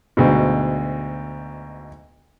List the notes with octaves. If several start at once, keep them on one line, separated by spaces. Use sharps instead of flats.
D2 G#2 B2